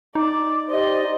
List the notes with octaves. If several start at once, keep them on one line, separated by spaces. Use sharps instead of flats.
D#4 D5 D6
G4 C5 D5 D#5